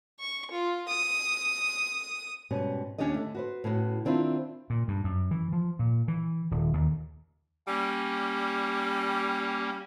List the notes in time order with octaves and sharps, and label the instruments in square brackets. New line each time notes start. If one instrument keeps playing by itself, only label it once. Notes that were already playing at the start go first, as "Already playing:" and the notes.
[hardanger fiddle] C#6
F4
D#6
[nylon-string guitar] G#2 B2 G3 C#4
D#2 C#4 D4 G4 D5 D#5
D3 A3
F#4 B4 C5
A2 C#3 B3 F#4
D#3 C4 D4 E4 F4
[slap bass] A#2
G2
F#2
E3
F3
A#2
E3
D#1
D#2
[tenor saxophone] G3 [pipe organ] A#3 C#4